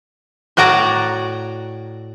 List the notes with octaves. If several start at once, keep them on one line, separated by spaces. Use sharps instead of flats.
A2 F#4 D5 A#5